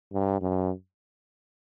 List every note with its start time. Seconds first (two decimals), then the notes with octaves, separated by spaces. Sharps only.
0.13 G2
0.41 F#2